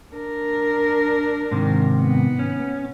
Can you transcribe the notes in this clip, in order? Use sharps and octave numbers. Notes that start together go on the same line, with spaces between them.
D4 A#4
G#2 C3 D#3
B3
C#4